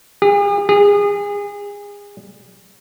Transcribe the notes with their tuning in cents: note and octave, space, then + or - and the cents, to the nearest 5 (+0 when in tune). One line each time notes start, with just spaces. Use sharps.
G#4 -45
G#4 -30